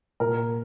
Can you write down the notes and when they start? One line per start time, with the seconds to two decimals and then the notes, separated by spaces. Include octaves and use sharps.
0.20 A#2 A#4